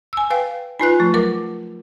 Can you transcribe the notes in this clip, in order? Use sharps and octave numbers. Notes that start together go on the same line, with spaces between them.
G#5 E6
B4 F5 G5
D#4 F4 B4 G#5 F#6
F3 A3
F#3 A#4 D6